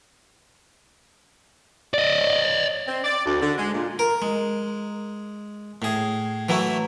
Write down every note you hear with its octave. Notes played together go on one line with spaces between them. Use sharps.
D5 D#5
C4
D5
D2
D3
G#3
A#2
A#4
G#3
A2 G#4
E3 F#3 A3 E4